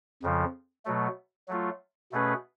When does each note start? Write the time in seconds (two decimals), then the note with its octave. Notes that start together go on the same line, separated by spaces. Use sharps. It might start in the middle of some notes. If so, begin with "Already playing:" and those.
0.23 F2 C#3 F3
0.85 B2 F#3 A3
1.48 F#3 A3 F4
2.12 B2 A3 C#4 G#4 B4